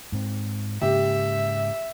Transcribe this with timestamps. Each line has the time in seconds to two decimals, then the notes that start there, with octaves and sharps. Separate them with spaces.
0.12 G#2 C4
0.82 G#2 C#3 A#3 G4 E5